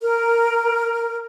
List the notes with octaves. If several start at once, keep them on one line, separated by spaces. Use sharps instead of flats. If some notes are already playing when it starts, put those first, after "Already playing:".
A#4